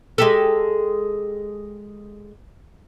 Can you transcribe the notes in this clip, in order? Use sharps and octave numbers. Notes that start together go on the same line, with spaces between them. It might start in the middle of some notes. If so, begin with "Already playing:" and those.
G#3 G4 A4